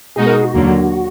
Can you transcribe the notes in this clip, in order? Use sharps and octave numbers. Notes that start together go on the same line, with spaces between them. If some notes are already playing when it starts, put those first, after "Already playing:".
B2 G#3 D#4 F#4 G#4
A#4
G#4
F#4
D#2 D3 F#3 A#3